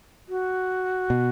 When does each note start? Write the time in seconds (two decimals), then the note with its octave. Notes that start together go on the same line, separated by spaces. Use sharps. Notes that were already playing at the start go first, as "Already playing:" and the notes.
0.29 F#4
1.10 B2